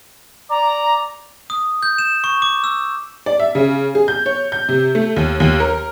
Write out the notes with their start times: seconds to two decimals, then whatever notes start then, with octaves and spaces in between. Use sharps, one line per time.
0.50 D5 A#5
1.50 D#6
1.83 G6
1.98 E7
2.24 C#6
2.42 D6
2.64 E6
3.26 D5
3.40 E5
3.55 C#3
3.95 G#4
4.08 G6
4.26 C#5
4.52 G6
4.69 C3
4.95 A3
5.16 D#2
5.40 D#2
5.60 A#4